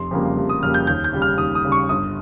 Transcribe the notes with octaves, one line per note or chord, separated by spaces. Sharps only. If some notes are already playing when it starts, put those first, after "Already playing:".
Already playing: F1 C6
F2 C#3 G3 A#3
F1
D#6
F2 C#3 G3 A#3 F6
G6
D#2 G6
G6
C#3 G3
F6
D#2 D#6
D#6
C#3 G3
C#6
G1 D#6